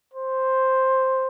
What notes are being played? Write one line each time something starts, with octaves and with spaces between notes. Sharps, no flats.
C5